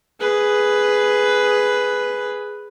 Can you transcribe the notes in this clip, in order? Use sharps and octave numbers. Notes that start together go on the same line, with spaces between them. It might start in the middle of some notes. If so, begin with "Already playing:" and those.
G#4 B4